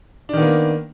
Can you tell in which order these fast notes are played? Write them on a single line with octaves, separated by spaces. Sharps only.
D4 D#3 B3 A#3